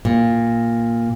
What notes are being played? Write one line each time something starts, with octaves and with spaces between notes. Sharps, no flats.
A#2